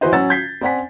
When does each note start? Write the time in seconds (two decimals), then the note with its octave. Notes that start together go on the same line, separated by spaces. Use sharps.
0.01 E3 E4 F#4 B4 C5 D#5
0.12 F#3 C#4 F#5 E6 A6
0.30 G6 G#6 B6 C7
0.61 C4 D5 F#5 G#5 B6